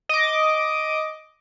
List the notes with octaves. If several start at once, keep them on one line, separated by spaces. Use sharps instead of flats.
D#5 D6